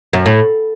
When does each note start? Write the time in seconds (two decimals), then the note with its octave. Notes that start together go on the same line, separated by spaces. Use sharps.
0.13 F#2
0.26 A2